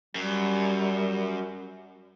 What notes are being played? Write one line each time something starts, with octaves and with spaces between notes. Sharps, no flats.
F#2 G3